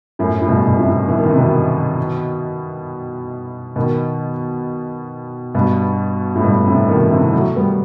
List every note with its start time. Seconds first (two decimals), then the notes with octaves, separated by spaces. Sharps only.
0.19 F#2 A2
0.42 A2
0.49 G2 B2
0.67 B2
0.78 A2 C3
1.08 E3
1.18 D#3
1.29 C3
1.38 B2 D#3
3.76 B2 D#3
5.55 G2 B2
6.36 A2
6.44 G2 B2
6.66 A2 C3
6.88 B2 D#3
7.11 C3 E3
7.33 F#3 A3
7.56 G3 B3